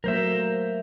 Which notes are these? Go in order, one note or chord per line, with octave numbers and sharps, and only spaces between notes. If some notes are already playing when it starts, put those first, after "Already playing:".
F#3 A3 A#3 A#4 C5 E5